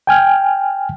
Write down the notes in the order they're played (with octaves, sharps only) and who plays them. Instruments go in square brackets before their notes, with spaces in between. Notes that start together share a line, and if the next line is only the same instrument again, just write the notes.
[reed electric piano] G5 G#5 F6